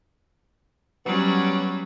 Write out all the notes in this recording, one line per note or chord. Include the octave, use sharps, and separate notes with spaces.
F#3 G3 B3 C#4